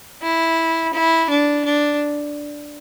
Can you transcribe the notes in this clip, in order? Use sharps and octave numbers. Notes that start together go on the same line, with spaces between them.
E4
E4
D4
D4